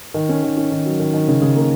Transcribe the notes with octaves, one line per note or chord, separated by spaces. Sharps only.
D#3
C#4
D#3
C#4
D#3
F#3
D#3
D#3
C#3
C#3
A#3